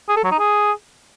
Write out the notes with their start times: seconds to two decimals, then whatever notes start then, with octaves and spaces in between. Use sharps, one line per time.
0.09 G#4
0.16 A4
0.24 F#3
0.31 D#4
0.39 G#4